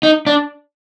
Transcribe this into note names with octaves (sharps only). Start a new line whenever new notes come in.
D#4
D4